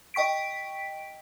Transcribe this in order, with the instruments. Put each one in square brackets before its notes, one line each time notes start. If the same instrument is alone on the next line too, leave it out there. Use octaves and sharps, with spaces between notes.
[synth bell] D#5 G5 C#6 B6 D7